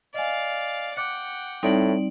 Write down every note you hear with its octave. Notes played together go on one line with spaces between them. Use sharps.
D5 D#5 F5 G#5
F#5 G5 D6 F#6 C#7
A2 G3 C4 D#4 D5 D7 F#7